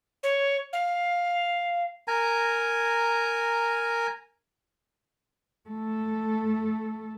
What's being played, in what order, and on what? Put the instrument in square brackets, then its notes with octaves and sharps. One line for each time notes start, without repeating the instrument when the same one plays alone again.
[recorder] C#5
F5
[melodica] A#4 G#5 A#5
[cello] A3 A4